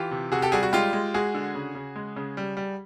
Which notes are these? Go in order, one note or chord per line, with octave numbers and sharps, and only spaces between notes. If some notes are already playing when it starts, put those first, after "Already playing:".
Already playing: E3 F4 G4
C3
C3 F#4 G#4
G4 A4
G3 F#4 G#4
F#4
G#3 F4 G4
G#3
G#3 F#4 G#4
D3
C#3
C#3
G#3
C#3
G3
G3